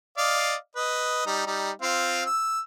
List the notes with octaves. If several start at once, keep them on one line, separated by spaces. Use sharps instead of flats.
D5 D#5 F5
B4 D#5
G3 D#4
G3 D#4
C4 F4 F5
E6